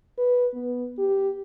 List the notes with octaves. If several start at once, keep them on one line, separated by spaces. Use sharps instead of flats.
B4
B3
G4